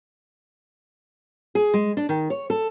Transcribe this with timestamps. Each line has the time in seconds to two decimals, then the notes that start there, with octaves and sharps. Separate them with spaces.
1.55 G#4
1.74 G#3
1.97 D4
2.09 D#3
2.30 C#5
2.50 A4